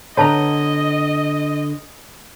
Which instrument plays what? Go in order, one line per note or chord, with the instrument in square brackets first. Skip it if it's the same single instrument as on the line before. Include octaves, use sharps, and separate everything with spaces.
[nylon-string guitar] D3 B3 [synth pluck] B4 A#5 [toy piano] C#5 A5 [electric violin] D#5